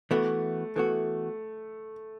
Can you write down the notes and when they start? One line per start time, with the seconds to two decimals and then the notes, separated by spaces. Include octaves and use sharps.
0.11 E3 A3 B3 F#4
0.76 E3 A3 B3 F#4